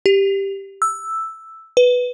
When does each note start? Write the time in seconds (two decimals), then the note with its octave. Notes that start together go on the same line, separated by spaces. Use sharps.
0.06 G4
0.82 E6
1.77 B4